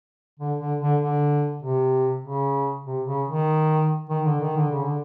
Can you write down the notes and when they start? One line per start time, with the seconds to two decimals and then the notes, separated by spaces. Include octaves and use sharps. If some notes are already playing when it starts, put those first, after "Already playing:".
0.39 D3
0.60 D3
0.81 D3
1.01 D3
1.63 C3
2.25 C#3
2.86 C3
3.07 C#3
3.28 D#3
4.10 D#3
4.26 D3
4.40 D#3
4.56 D3
4.71 C#3
4.83 D3